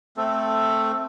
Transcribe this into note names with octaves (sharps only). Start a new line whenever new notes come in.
A3 C4 A4